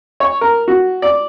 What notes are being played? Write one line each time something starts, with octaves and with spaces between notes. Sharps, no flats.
C#5
A#4
F#4
D5